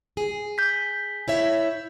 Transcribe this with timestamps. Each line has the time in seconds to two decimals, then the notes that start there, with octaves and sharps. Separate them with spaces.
0.17 G#4
0.58 G6 B6
1.28 E4 C#5 E5